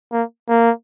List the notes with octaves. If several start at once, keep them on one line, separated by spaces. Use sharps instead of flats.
A#3
A#3